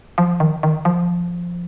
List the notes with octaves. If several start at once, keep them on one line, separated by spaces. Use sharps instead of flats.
F3
D#3
D#3
F3